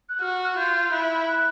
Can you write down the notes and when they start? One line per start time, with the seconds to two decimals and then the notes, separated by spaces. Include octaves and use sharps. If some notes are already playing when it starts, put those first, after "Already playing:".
0.09 F#6
0.21 F#4 F6
0.33 F#6
0.45 F6
0.51 F#6
0.57 F4 G6
0.92 E4 F#6
1.28 F#6